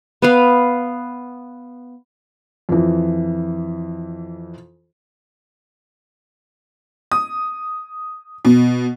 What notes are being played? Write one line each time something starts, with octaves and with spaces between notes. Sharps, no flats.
B3 B4 F5
F2 E3
D#6
B2